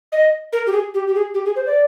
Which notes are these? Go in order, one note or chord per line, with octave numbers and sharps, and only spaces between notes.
D#5
A#4
G4
G#4
G4
G4
G#4
G4
G#4
C5
D5